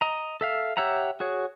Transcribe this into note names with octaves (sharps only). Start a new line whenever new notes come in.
D#5 A#5
A4 E5 F5
G4 C#5 E5 F#5 A#5
F#4 G#4 C#5